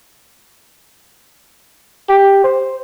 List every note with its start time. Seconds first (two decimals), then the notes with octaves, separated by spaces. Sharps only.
2.09 G4
2.44 C5